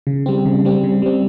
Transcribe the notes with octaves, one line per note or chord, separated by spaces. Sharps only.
C#3
G3 C4
C#3
G3 C4
C#3
G3 C4